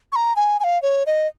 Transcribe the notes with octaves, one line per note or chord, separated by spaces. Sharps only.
C#6
A#5
G#5
G#5
F5
C#5
D#5